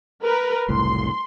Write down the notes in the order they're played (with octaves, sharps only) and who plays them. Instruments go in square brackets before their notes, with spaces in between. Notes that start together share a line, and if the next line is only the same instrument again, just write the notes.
[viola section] A#4 B4
[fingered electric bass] F#1 C2 A2 [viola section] C6